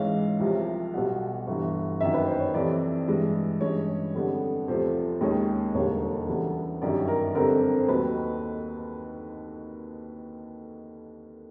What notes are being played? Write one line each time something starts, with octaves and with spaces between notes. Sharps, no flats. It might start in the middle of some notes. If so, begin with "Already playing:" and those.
Already playing: G#2 E3 G#3 C#4 F5
C2 C3 F3
B1 B2 G3 F#5
G1 G2 E3
F#1 F#2 D#3 E5
B4
C5
C#5
F2 C3 E3 D5
G2 E3 G#3
G2 E3 G#3 C#4 C#5
F2 D3 G3 B3
E2 C3 F3 A3 C5
D#2 D#3 G#3 C#4
E1 D#2 D3 G3 C#5
D2 C#3 E3 G3 B3
G1 F#2 D#3 G3 D5
A#4
F2 D3 G3 C4 A#4
A#4
C5
D#2 D#3 F#3 A3 B4